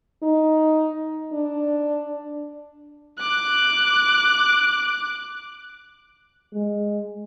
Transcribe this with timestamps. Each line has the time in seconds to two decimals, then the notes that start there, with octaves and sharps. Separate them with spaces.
0.22 D#4
1.33 D4
3.19 D6 F#6
6.54 G#3